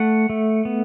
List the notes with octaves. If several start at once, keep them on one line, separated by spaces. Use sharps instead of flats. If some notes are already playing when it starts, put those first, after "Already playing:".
Already playing: A3 F#5
A3
B3